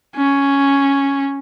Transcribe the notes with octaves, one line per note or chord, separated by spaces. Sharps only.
C#4